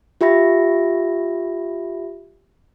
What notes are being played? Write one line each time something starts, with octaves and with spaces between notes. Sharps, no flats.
F4 G4 E5 B5 A#6